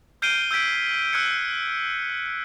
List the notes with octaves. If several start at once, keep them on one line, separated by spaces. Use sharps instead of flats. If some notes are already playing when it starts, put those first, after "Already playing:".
F6 G6 C7 D7 D#7 G7
E6 G6 G#6 B6 D7
E6 F#6 G#6 C#7